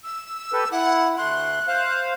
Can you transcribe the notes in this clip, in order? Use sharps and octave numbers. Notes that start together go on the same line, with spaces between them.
E6
G4 A4 B4
E4 F#5
D2 A3 C6 F#6
C5 F5